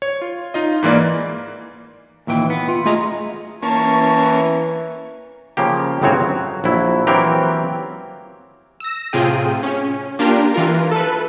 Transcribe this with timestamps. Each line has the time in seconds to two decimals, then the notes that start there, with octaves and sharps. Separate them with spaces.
0.02 C#5
0.21 F4
0.54 D#4 F4 D#5
0.83 G#2 E3 A#3 D5
2.27 D#2 A#2 E3 G5
2.50 B3
2.68 F4
2.85 A3 F4 G#4 D#5 A#5
3.63 E3 A#3 C#4 A5 C#6
5.57 C#3 F3 A#3 G4
6.02 G1 A2 C#3 C4 F#4 C#5
6.20 F#3
6.64 A#1 F#3 E4
7.07 E3 F#3 A#3 C4 G4 A#4
8.80 E6 A#6
9.13 A2 C3 F4 G#4 G5 D#7
9.63 C#4
10.19 A#3 D4 F4 G4 A#4
10.54 E3 F4 A#4
10.91 A4 B4